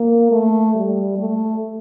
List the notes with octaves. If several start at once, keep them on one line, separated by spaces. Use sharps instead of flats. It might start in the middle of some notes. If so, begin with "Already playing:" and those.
Already playing: A#3
A3
G3
A3